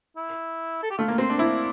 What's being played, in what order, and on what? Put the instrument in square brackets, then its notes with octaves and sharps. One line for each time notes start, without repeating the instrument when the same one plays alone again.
[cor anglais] E4
A4
G4
[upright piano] A3 [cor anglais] F4
[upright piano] A#3
[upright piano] C4 [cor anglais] C5
[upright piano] D4
[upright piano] E4 [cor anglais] D5